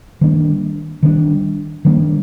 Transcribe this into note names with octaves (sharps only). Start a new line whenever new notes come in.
D#3 G3 A#3 D4
D#3 G3 A#3 D4
D#3 G3 A#3 D4